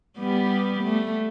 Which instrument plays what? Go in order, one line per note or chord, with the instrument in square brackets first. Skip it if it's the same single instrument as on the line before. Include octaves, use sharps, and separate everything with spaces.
[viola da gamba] G3 B3 G4
A3